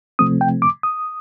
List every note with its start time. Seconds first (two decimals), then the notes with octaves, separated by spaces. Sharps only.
0.19 C3 F3 A3 C4 D#6
0.41 G5
0.62 D6
0.83 D#6